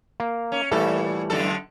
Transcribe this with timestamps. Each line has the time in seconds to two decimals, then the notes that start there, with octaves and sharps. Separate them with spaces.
0.20 A#3
0.52 C#4
0.71 A#2 E3 G3 A3 A4
1.30 F#2 D3 A4